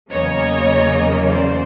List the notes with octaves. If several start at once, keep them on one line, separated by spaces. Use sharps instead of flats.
E2 C#3 F#3 A#3 C#4 C#5 D#5
C5 D5